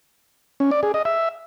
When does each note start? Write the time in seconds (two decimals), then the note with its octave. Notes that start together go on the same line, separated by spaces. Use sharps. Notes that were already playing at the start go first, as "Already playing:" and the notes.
0.60 C#4
0.71 D5
0.83 G#4
0.94 D#5
1.05 E5